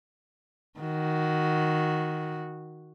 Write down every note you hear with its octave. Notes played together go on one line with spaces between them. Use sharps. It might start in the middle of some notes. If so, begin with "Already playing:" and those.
D#3 F#4